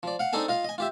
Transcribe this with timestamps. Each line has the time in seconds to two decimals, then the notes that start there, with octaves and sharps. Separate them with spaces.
0.03 F3 D5
0.19 F5 F#5
0.33 C4 D4 D#4 G#4 A4 G#5
0.48 F4 D#5 F5
0.65 D#5 G#5
0.78 F4 G4 E5